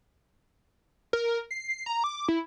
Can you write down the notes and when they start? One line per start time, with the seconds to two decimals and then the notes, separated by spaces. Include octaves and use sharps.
1.13 A#4
1.51 C7
1.86 A#5
2.04 D6
2.28 E4